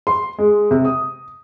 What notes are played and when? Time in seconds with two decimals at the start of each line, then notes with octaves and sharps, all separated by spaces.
0.07 C6
0.38 G#3
0.71 C3
0.85 D#6